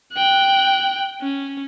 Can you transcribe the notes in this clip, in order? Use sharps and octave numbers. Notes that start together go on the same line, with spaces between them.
G5 F#6
C#4